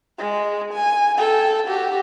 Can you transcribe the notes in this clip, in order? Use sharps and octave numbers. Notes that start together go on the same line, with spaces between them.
G#3
G#5
A4 G5
F#4 G4